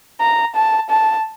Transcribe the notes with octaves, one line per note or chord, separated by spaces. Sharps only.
A#5
A5
A5